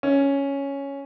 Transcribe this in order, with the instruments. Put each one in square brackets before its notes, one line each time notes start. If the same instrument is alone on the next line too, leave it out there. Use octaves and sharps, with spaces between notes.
[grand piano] C#4